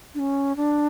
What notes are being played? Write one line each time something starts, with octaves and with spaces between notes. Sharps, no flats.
D4
C#4
D4